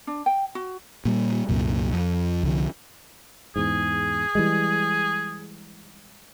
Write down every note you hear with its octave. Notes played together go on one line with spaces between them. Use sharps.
D4
G5
F#4
A#2 G3
C2 F#2 A#2
F2
C2 D3 F3
E2 G#2 G#4
E3 G3 G#3